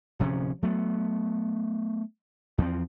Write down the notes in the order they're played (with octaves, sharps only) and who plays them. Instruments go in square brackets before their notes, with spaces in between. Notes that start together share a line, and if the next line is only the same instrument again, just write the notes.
[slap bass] D1 C3 F3 C#4
F#3 A3 B3
E2 F3 C4